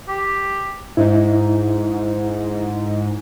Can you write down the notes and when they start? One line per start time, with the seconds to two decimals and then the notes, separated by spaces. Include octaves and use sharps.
0.08 G4
0.97 G#2 D#4 E4